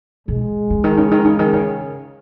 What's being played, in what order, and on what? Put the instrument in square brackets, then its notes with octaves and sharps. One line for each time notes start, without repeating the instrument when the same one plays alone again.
[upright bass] B2 [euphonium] G#3
[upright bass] C#3
D#3
C#3
D#3
C#3
D#3
C#3